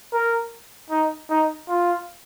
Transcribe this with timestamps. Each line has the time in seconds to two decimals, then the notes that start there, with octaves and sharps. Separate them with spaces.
0.13 A#4
0.91 D#4
1.30 D#4
1.69 F4